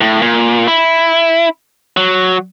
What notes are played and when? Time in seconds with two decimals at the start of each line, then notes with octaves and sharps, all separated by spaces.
0.01 A2
0.22 A#2
0.67 E4
1.97 F#3